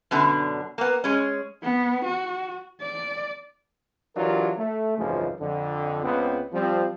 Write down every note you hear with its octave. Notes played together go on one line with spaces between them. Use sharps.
F#2 B2 D3 D4
A#3 B3
G#3 C#4
B3
F#4
D5
E3 F#3 D4 F4 G4 A#4
A3
G#1 C#2 F#2 E3 F3 G#3
F2 D3
C#2 B3 C4
F3 G3 C4